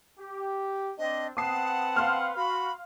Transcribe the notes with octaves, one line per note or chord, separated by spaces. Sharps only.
G4
C4 D4 D#5
C4 B4 F#5 A5 D#6 C7
F5 C6 F6
F#4 B5